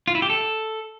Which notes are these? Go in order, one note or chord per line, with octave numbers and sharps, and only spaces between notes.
F4
E4
G4
A4